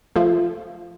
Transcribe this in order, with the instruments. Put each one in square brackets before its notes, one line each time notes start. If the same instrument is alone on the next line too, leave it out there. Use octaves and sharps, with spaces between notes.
[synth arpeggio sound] F3 A3